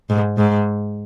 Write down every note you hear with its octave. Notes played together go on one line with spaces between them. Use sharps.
G#2
G#2